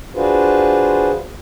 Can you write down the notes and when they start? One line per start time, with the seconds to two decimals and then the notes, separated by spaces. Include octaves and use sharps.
0.15 D4 F4 F#4 G#4 B4 C5